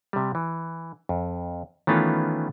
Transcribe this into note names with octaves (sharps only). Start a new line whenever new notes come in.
C3 G3
E3
F2
D#3 E3 A3 B3 C#4 F4